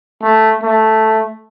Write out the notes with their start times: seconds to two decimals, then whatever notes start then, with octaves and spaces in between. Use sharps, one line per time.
0.23 A3
0.63 A3